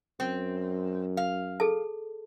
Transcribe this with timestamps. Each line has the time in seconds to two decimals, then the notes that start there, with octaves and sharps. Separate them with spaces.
0.20 F#2 C4
1.17 F5
1.60 G#4 A4 A5